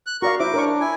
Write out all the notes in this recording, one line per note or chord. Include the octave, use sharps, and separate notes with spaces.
F#6
F#4 A#4 D5 F5 C#6
E4 C5 E5 D6
D4 A#4 C#5 C#6
E4 G#5